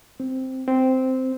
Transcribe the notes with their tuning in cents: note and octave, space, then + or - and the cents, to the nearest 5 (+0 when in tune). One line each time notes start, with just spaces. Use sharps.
C4 -5
C4 -10